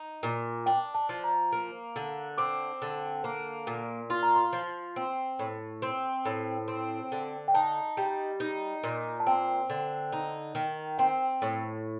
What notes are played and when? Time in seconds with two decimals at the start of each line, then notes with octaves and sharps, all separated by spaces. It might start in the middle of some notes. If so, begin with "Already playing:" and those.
Already playing: D#4
0.23 A#2
0.66 D4 G5
0.95 A5
1.09 F3
1.24 A#5
1.52 A#3
1.96 D3
2.38 C4 D6
2.82 D3
3.24 A#3
3.67 A#2
4.10 F4 C6
4.23 A#5
4.36 C6
4.53 F3
4.96 C4
5.39 A2
5.82 C4
6.26 A2
6.68 C4
7.12 D3
7.48 G5
7.54 D#4 A5
7.97 G3
8.40 D#4
8.84 A#2
9.20 A5
9.27 C4 G5
9.70 D3
10.13 D#4
10.55 D#3
10.98 C4 G5
11.42 A2